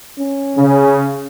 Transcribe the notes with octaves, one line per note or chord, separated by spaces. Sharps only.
C#4
C#3